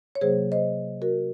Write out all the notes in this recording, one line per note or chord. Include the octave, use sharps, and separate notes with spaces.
C#5
C3 F#3 A#3 G#4 C5
C5 D#5
F#4 A#4